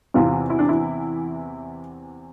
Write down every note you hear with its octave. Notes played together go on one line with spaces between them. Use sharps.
E2 C3 E3 F4
E4
D4
E4